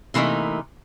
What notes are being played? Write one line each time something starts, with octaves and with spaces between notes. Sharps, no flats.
C3 E3 A3 A#3 D#4